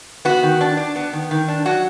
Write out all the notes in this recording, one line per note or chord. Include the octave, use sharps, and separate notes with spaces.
B3 F#4
D#3
D4
D4
B3
D#3
D#3
D4
F#3 F#4